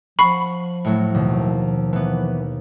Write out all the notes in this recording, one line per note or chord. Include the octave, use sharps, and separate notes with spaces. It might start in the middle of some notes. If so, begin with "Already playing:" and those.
F3 F#5 B5 C#6 C7
A2 F#3
D#2 B2
E3 B3